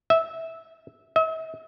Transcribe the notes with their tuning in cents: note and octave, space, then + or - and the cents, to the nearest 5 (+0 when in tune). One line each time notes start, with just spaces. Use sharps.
E5 -15
E5 -45